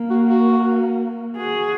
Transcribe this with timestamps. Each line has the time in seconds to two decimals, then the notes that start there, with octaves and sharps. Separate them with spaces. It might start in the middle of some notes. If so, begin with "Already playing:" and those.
Already playing: A#3
0.10 F#4
0.28 F#4
1.37 F#4 G#4